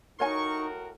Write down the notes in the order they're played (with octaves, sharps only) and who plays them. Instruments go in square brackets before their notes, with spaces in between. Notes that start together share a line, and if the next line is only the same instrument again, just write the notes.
[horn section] A2 F#4 A#4 [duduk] D#4 [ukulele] C#5 G#5 [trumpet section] C#6